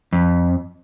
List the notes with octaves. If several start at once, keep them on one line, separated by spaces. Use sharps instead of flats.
F2